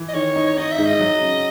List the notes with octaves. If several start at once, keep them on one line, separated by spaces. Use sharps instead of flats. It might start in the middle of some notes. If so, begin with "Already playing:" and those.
Already playing: E3
D#5
D#3 C#5
D#4
C#5
D#4 D#5
E5
G#2
D#5
F#3
C#3